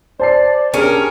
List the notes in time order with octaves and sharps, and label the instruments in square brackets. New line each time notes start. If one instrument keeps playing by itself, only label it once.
[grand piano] C5 A5 C7 [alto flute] D5
[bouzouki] C#4 [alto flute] D4 [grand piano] G4 G#4 [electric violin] A#4